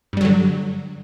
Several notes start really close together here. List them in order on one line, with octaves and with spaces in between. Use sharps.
G2 G3 F#3 D3